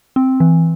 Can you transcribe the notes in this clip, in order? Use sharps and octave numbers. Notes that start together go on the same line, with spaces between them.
C4
E3